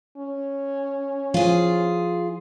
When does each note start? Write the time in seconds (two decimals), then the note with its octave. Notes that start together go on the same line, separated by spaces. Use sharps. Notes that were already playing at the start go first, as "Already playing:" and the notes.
0.18 C#4
1.34 F3 F4 G#4